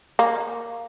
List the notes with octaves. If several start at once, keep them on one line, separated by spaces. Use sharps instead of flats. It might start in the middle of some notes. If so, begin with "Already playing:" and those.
A#3